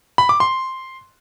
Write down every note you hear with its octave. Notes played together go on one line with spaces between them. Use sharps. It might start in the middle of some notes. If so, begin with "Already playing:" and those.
B5
D6
C6